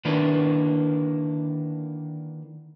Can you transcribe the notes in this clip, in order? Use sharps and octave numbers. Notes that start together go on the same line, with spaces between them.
D3 D#3 A#3 D4 E4 B4